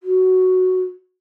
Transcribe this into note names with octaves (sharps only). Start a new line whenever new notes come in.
F#4